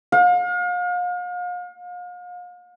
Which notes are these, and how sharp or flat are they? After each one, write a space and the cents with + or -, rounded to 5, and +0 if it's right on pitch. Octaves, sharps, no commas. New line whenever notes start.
F5 +40